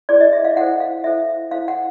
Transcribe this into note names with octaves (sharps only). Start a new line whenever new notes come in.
E4 G#4 C5 D5
D#5
E5
F5
E4 A4 C5 F#5
F5
E4 A4 C5 E5
E4 A4 C5 F5
F#5